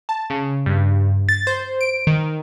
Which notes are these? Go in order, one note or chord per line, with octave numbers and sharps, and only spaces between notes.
A5
C#3
G2
A6
C5
D7
D#3